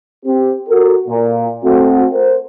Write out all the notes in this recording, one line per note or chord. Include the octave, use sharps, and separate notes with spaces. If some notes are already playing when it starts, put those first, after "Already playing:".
C4 G4
F#4 A4 A#4
A#2
A3 C4 F#4 A4
A#4 C5